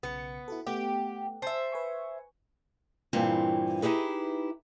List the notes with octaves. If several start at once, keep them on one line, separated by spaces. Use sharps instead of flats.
B1 C#3 B3 C#7
E4 F#4 A4
A3 B3 G4 F#5
C5 E5 G#5 A5
B4 G#5 C#6
G2 A#2 E3 C4
D#4 E4 G4 G#4 B4